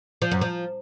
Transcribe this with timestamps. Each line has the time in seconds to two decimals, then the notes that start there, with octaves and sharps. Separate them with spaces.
0.22 F3
0.32 F#2
0.41 F3